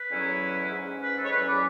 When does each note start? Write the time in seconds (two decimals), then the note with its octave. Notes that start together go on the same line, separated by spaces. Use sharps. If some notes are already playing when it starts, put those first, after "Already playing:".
Already playing: B4
0.10 E2 D3 F#3 C#4 E4
0.71 G#2 G#3 C#4
1.01 B4
1.17 A4
1.24 C#5
1.32 E2 D3 F#3 C#4 B4
1.47 D5